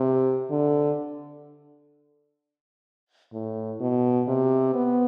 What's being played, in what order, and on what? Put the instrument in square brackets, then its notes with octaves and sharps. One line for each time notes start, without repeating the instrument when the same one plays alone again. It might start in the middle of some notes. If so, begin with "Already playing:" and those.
Already playing: [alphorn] C3
D3
A2
B2
C3
B3